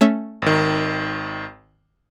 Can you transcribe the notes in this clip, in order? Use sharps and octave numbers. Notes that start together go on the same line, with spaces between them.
A3 C#4 E5
G#1 D#3